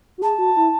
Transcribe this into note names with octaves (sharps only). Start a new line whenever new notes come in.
F#4
G#4 A5
F#4
E4